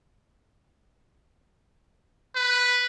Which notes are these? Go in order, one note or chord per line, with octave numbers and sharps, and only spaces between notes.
B4